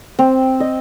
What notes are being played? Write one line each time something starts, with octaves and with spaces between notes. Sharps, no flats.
C4
D#5